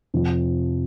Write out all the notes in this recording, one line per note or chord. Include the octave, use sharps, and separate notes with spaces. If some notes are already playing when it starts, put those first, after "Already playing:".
F2 C3 F3 C4